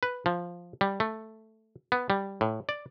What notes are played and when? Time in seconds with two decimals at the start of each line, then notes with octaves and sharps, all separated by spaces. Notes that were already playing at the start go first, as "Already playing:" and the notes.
0.03 B4
0.26 F3
0.81 G3
1.00 A3
1.92 B3
2.10 G3
2.41 A2
2.69 D5